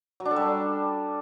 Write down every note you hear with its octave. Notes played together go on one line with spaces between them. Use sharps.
F#3
D4
A4
G3